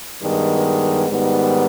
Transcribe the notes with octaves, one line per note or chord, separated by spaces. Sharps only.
G2 D#3 G#3 B3
G#2 D#3 G3 B3